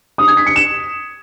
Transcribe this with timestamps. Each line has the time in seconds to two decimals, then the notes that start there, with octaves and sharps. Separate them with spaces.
0.18 D#6
0.28 G#6
0.37 B6
0.46 C#7
0.56 E7